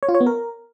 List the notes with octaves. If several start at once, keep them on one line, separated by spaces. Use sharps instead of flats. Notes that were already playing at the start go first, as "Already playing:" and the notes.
C#5
F4
C#5
B3
A#4